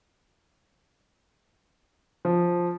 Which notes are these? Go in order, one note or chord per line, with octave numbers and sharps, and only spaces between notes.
F3